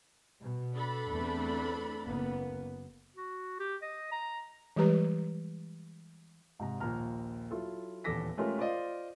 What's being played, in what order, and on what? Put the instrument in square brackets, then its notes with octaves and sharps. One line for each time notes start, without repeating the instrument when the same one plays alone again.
[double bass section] B2
[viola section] D4 A4 B5
[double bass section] E2 A3 C4
F#1 A#3 B3
[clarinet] F#4
G4
D#5
A#5
[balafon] E3 G3 G#3 G4 B4 A#5
[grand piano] G#2 C3 A#5
A#1 D#2 A#5 F6
F#3 E4 F4 A4
D#1 E2 A4 D6 A#6 B6
G#3 A3 C#4 F4 G4 A#4
F4 C5 D5 D#5 F5